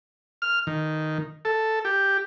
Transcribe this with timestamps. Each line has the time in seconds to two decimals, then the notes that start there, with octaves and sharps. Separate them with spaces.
0.42 F6
0.67 D#3
1.45 A4
1.85 G4